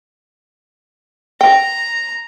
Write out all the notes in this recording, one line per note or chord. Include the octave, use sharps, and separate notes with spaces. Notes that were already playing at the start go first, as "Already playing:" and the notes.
G5 A#5